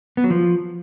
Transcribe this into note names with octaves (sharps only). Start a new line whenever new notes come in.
B3
F#3
F3